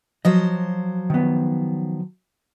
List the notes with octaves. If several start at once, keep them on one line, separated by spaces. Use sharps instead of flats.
F3 F#3 C5 D#5
D#3 B3